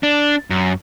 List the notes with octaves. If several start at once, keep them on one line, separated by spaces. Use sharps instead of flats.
D4
F#2